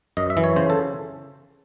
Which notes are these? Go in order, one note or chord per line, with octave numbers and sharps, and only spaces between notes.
F#2 D#5
E5
E3
C#5
C#3 C5
A4